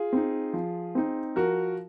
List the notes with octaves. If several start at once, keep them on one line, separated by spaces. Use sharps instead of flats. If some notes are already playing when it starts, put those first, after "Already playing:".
Already playing: F4 G#4
C4 D#4
F3
C4 D#4
F3 F#4 A#4